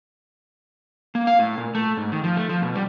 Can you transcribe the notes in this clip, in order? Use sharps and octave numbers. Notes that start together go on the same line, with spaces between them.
A#3
F5
A2
A#2
A3
G#2
D#3
F3
A3
F3
B2
G3